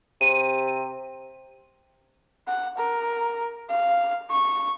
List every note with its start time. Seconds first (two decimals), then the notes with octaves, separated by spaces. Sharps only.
0.21 C3 D#7
2.48 F#5
2.78 A#4
3.70 F5
4.31 C#6